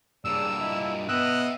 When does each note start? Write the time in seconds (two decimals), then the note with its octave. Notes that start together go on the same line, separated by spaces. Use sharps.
0.25 G2 A#3 G#4 C#5 D5 E6
0.59 D4 E4 F4 D#5
1.09 B3 D#5 E5 G5 E6 F#6